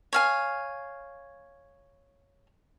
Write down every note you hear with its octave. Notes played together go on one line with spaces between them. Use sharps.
C#5 F5 G#5